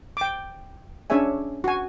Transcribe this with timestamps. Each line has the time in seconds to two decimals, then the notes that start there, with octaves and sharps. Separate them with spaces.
0.17 G5 D6
1.10 C#4 D4 G#4 C#5 E5 G#5
1.64 F#4 G#5